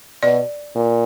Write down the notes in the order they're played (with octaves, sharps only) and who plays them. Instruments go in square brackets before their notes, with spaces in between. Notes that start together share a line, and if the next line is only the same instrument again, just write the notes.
[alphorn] B2 [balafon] D5
[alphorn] A#2